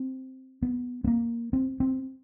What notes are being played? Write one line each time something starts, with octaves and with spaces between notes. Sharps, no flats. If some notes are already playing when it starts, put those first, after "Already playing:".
Already playing: C4
B3
B3
A#3
C4
C4